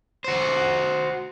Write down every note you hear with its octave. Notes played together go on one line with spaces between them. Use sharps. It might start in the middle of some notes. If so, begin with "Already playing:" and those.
F#4 C5